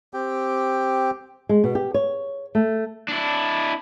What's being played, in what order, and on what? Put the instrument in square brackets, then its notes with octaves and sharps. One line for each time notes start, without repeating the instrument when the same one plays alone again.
[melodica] C4 G4 G5
[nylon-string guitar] G#3
B2
G4
C#5
A3
[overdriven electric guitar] D4 E4